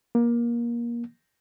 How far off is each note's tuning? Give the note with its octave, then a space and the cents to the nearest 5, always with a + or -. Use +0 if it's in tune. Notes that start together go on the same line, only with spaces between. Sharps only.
A#3 +20